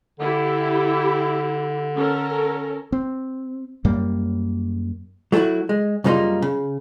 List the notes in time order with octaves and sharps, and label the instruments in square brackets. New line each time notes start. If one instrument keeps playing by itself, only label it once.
[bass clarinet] D3 [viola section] E4 G4
[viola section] C#4 A4 A#4
[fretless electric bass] C4
F#2 G3 A#3
[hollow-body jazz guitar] F#3 A3 B3 E4 F#4
G#3
F#2 C#3 G3 A#3 D#4 F4
C#3